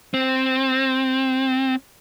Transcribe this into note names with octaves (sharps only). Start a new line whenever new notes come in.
C4